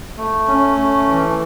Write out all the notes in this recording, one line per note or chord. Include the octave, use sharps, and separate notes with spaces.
A3
C#4
A3
E3